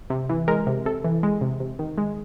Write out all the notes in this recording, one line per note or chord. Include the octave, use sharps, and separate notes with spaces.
C3
E3
G#3 A#4
C3
C3 A4
E3
G#3
C3
C3
D#3
G#3